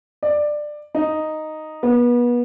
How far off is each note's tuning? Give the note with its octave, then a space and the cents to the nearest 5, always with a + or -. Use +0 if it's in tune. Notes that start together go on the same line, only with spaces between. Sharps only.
D5 +15
D#4 +0
B3 -30